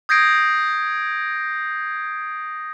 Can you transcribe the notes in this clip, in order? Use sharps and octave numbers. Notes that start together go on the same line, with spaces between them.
D#6 G6 G#6 A#6 C7 D7